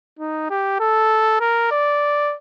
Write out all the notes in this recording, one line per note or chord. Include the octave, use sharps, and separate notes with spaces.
D#4
G4
A4
A#4
D5